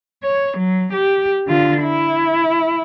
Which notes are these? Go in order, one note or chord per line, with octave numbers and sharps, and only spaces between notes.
C#5
F#3
G4
D3 F4
E4